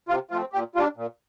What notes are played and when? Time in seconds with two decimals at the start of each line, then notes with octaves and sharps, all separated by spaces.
0.09 C3 F4
0.31 F3 A3 C4 F4
0.53 A#2 G4
0.75 G3 D4 F4
0.97 A#2